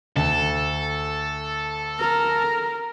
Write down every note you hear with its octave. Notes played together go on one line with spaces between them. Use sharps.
D2 A4
A#4